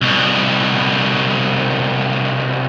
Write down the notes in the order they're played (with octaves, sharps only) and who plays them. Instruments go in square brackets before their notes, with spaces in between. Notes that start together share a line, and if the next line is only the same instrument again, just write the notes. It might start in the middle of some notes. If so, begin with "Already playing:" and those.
[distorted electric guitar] C2 B2